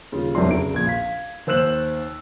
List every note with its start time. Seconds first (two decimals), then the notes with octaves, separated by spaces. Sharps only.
0.12 D#1 C#3 F4
0.35 F1 B1 C3 F#3 D4 C6
0.50 C#3 D7
0.74 A#1 G#6
0.86 F5 B6
1.47 D#2 C5 E6 F#6 E7 F#7